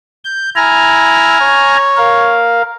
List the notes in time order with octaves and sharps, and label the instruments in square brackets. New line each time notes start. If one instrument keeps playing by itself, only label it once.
[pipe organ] G6
[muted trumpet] E4 [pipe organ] G#5 A#5 F6
[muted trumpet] C#5
[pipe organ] A#4 F5